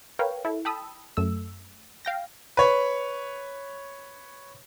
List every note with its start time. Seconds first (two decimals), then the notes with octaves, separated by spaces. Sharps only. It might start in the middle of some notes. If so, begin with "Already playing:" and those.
0.19 A#4 B4 C#5 F5 G5
0.45 E4 A4
0.65 G5 A5 B5 D#6 E6
1.17 F#2 A3 E6
2.05 F5 G5 A#6
2.57 B4 C#5